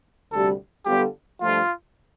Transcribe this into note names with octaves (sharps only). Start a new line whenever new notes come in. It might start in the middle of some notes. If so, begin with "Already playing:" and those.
D2 C3 G3 A4
D3 G3 B3 F4 G4 A4
G2 F3 A3 F4